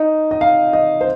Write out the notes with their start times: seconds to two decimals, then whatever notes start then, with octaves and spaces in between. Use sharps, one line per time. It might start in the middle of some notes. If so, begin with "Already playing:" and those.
Already playing: D#4
0.31 D#5
0.41 F5
0.73 D#5
1.01 C5